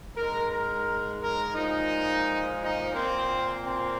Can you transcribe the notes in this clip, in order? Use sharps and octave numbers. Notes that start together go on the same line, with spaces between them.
G#2 G#3 A#4
A#4
A#4
A#2 F3 G#3 D#4
D#4
A#2 A#3 C4
C4